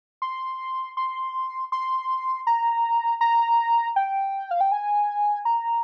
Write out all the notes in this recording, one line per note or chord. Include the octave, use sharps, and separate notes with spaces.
C6
C6
C6
A#5
A#5
G5
F5
G5
G#5
A#5